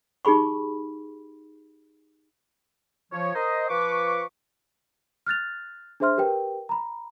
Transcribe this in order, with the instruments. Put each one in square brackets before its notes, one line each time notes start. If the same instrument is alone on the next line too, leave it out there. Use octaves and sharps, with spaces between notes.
[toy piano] D#4 G4 G#4 B5 C#6
[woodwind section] F3 C#5
A#4 C5 D#5
F3 B4 C#6 D6
[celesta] F6 F#6 A6 F7
D4 G#4 C5 E5 C6 F6
G4 A#4 B4 G5
A#5 B5